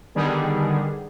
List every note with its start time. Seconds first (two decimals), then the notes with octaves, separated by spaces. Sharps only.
0.15 D3 D#3 G3 B3 G#4